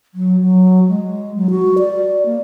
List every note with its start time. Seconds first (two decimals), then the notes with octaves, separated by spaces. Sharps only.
0.14 F#3
0.41 F#3
0.88 G#3
1.36 F#3
1.50 F#4
1.78 D5
2.26 A#3